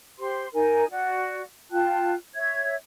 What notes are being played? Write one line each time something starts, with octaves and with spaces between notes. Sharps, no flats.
G4 C5 C6
D#4 A#4 G#5
F#4 D5 F#5
F4 G5 A5 F#6
C#5 E5 G#6